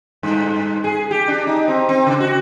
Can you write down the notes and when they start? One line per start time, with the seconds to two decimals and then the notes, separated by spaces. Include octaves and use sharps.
0.23 G2
0.84 G#4
1.11 G4
1.28 D4
1.47 D#4
1.68 C4
1.89 C4
2.07 C#3
2.20 F#4